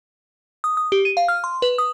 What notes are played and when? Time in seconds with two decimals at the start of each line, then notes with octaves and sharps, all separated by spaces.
0.64 D#6
0.77 D#6
0.92 G4
1.05 D#7
1.17 F5
1.28 F6
1.44 C6
1.62 B4
1.78 D#6